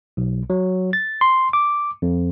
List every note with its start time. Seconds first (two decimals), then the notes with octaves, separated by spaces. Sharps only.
0.17 B1
0.50 F#3
0.93 A6
1.21 C6
1.53 D6
2.02 F2